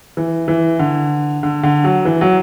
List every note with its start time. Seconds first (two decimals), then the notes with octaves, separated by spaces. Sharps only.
0.17 E3
0.48 E3
0.79 D3
1.43 D3
1.63 D3
1.84 F#3
2.05 E3
2.21 F#3